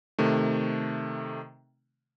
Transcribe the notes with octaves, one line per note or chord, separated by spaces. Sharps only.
C3 D#3 A3